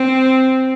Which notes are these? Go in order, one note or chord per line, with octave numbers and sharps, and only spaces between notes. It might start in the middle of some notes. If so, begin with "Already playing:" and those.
Already playing: C4